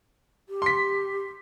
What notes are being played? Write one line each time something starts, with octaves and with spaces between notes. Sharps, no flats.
G4
C6 B6